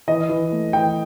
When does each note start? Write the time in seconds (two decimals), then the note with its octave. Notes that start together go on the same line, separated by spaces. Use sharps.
0.08 E3 D#5
0.29 E3
0.52 A3
0.73 E3 G5